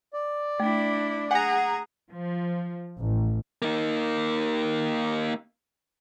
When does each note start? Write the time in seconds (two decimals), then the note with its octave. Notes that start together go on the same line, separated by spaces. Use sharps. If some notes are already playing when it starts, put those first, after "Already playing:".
0.14 D5
0.60 A3 D4 E4
1.31 G#4 F#5 G#5 A#5
2.12 F3
2.98 A1
3.62 A#3 D#4